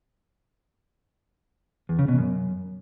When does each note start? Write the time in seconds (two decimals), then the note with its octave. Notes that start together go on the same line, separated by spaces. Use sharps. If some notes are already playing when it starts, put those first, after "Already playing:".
1.89 E2
1.99 C#3
2.08 B2
2.18 F#2